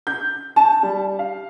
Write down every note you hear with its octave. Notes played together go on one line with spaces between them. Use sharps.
G6
A5
G3
F5